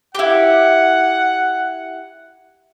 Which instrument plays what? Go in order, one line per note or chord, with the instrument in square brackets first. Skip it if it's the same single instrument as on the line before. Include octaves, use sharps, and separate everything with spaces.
[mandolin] E4 G4 [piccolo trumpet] F#5